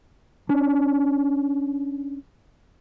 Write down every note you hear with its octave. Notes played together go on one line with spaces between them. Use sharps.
C#4 D4